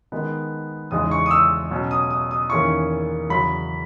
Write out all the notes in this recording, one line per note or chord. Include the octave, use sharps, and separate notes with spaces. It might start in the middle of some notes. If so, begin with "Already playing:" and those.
D#3 G#3 B3 D#4
E2 C#3 G#3 D#4 D#6
C#6
D#6
E6
B2 F#3 C#4
D#6
D#6
D#6
E2 D#3 A#3 C#4 E4 C#6
E2 C#3 F#3 B5